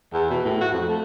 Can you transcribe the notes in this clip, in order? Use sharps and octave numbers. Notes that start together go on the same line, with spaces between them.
E2
B2
A2
F#4
F2
A3